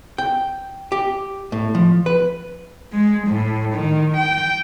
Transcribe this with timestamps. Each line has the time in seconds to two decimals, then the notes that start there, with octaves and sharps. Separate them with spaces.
0.18 G5
0.92 G4
1.52 A2
1.75 F3
2.06 B4
2.93 G#3
3.28 A2
3.74 D#3
4.18 G5